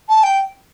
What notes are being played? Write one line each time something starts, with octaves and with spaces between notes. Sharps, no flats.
A5
G5